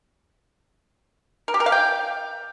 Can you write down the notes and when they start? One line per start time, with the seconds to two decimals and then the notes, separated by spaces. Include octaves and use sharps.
1.48 A#4
1.54 G4
1.60 A#4
1.66 F5
1.72 G5